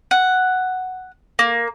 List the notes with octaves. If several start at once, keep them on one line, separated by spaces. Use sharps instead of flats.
F#5
A#3